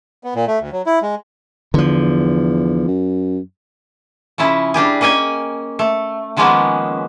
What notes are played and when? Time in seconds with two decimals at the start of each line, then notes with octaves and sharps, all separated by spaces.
0.24 B3
0.35 A#2
0.47 A3
0.60 D2
0.72 F#3
0.86 E4
1.02 G#3
1.74 E2 D3 F3
2.88 F#2
4.38 C#3 F3 C#4 E4
4.74 G3 D4 G4 G#4
5.01 A#3 C#4 D#5 G5 G#5
5.79 A3
6.37 D#3 F3 G#3 A#3 B3 C#4